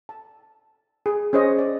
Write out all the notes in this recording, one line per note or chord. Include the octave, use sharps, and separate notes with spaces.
A5
G#4
C#4 G#4 C5 C#5 D#5
D5